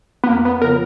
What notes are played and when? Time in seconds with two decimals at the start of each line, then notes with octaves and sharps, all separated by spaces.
0.24 B3
0.28 F2 A#3
0.45 B3
0.62 C#3 F3 B3 F4 A#4